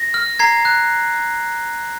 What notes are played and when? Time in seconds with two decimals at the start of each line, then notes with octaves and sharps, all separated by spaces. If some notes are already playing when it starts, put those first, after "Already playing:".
Already playing: A#6
0.14 F6
0.39 A#5 G#6 C7
0.65 F#6